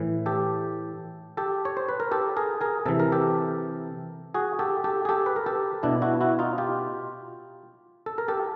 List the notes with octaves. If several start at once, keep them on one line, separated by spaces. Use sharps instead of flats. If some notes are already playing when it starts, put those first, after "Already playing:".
Already playing: A2 E3
G4 A4
G4 A4
C#5
C5
B4
A#4
G4 A4
G#4 A#4
G#4 A#4
C3 E3 A4
A#4
G4 A4
F#4 G#4
G4 A4
G4 A4
G#4
G4 A4
B4
A#4
G4 A4
B2 D4 E4
E4 F#4
E4 F#4
D#4 F4
F4 G4
A4
A#4
G4 A4